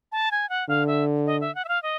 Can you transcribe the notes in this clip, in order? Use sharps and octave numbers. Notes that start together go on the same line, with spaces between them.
A5
G#5
F#5
D3 F5
E5
D#5
E5
F#5
E5
F5
D#5